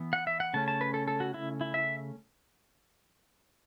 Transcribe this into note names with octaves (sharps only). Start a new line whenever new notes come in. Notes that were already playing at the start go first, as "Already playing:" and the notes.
Already playing: E3 B3
F#5
E5
F#5
C#3 A3 C#4 A5
A5
B4
A4
A4
F#4
E4
E4
E5